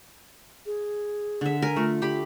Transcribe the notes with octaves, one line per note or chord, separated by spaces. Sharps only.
G#4
D3 E5
A#4 G#5
A3 F4
G4 B5